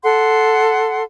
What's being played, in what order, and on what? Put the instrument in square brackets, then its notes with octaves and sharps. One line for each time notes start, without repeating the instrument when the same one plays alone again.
[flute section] A4 F#5 C6